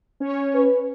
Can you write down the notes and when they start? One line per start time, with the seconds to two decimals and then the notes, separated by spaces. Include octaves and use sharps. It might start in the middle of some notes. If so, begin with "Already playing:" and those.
0.20 C#4 C#5
0.54 B4